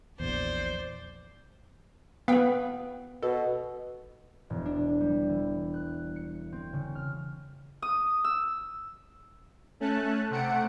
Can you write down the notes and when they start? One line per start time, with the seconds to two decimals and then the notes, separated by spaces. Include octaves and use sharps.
0.20 A#1 E2 C5 D5
2.28 B3 B4 F5 G5
3.23 B2 A4
4.50 E1
4.66 D4
5.01 G3
5.29 E3
5.74 F#6
6.16 C#7
6.52 C4
6.73 C#3
6.95 F6
7.82 D#6
8.24 E6
9.80 A3 C#4 A5 F#6
10.30 C3 A3 F#5 C#7 D7